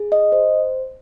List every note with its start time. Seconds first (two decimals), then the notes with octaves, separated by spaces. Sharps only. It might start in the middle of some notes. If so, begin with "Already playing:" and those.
Already playing: G#4
0.12 D#5
0.32 C5